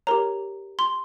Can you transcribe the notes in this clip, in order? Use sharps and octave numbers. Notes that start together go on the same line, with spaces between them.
G4 A#4 C#5 A#5
C6